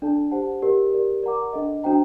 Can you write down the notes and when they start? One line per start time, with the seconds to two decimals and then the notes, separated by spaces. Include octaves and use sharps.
0.02 D4 A4 D5 A5
0.31 G4 C5 F#5 A5
0.62 G4 A#4 D5
0.92 G4 A#4 D5
1.23 A#4 D5 F#5 A#5 D6
1.53 D4 A4 D#5
1.84 D4 F#4 C5 G5 A#5